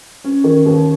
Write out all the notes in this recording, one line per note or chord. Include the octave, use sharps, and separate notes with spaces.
C#4
D#3
D#2